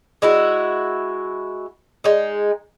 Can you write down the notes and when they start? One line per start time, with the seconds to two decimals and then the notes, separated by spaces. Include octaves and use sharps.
0.22 G#3 E4 F#4
2.04 G#3 D#4